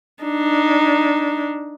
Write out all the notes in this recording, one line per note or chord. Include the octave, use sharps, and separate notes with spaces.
D4 D#4